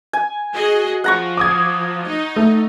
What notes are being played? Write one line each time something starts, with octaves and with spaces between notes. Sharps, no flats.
G#5
F#4 G#4 D#5
F3 F#5 A#5 C#6
D6 D#6 G#6
D#4 D#5
A3